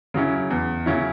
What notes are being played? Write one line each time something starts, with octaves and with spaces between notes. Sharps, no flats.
C#3 F#3 C#4 E4
E2
C#3 F#3 C#4 E4